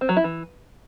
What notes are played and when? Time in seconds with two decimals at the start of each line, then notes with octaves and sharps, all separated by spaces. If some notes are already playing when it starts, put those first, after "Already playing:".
0.01 C4
0.09 F#3
0.17 E4
0.24 E3